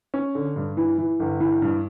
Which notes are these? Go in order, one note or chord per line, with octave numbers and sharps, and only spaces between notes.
C#4
D3
G2
E3
E3
G1
E3
G2